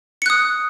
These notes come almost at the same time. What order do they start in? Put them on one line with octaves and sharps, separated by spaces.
C#7 F#6 D#6